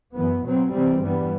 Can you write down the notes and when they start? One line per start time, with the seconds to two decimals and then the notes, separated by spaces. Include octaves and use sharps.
0.14 F#2 E3 B3
0.44 B2 F#3 C4
0.72 C3 E3 G3 C4
1.01 G2 E3 G3 B3